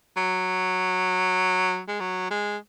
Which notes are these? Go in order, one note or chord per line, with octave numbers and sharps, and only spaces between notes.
F#3
G#3
F#3
G#3